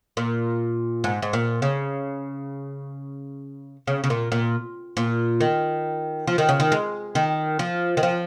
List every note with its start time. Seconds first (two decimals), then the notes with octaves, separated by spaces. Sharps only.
0.17 A#2
1.04 G#2
1.22 G#2
1.33 A#2
1.62 C#3
3.87 C#3
4.04 C#3
4.10 A#2
4.32 A#2
4.97 A#2
5.41 D#3
6.27 F3
6.38 D#3
6.49 C#3
6.60 D#3
6.72 G#3
7.15 D#3
7.59 F3
7.97 D#3
8.03 F3